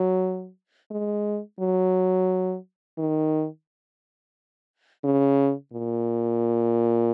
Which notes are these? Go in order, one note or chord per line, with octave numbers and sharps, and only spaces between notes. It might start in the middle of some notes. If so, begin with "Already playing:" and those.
Already playing: F#3
G#3
F#3
D#3
C#3
A#2